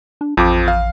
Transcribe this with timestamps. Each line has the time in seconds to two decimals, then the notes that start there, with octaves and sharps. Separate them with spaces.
0.21 D4
0.37 A1 F2 F3 D6
0.68 F5